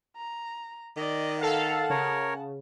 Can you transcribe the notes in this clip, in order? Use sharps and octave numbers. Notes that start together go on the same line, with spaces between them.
A#5
D#3 D5 D#5
A4 F5 F#5 A5
C#3 A#4 C#5